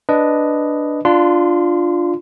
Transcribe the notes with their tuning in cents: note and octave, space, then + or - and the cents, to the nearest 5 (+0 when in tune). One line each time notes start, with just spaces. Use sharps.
D4 +0 B4 +0 D#5 +0
D4 +10 F4 +0 C6 -30